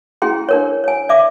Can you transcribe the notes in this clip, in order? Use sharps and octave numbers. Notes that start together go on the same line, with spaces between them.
C#4 E4 G#4 G5 C6
D4 A#4 C#5
C#5 G#5
D5 E5 D6